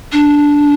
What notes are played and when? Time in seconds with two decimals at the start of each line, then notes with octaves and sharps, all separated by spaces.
0.13 D4